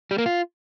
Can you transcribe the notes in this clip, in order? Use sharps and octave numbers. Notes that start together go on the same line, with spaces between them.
G3
A#3
F4